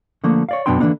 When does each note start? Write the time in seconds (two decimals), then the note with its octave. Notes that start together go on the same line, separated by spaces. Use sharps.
0.24 D3 F3 A3 A#3
0.49 C#5 D5 F5
0.66 F#2 B2 B3 D4 G5 C6
0.80 D3 E3 F#3 A#3 D4 D#4